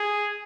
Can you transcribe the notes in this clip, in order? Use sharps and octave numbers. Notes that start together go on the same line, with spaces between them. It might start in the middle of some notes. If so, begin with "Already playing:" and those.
Already playing: G#4